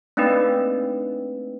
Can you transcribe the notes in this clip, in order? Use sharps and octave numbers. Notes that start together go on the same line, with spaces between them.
A3 A#3 C4 D4 D#4 B4